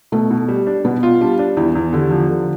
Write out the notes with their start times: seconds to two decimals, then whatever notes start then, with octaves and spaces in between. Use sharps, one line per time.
0.12 B2 A3
0.31 B2
0.48 G3
0.67 D4
0.85 B2 B3
1.03 F4
1.21 G3 D4
1.39 D4
1.57 E2 E4
1.75 E2
1.93 D3 G4
2.11 F3
2.29 D3